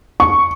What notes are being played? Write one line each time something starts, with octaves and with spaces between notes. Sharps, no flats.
C#6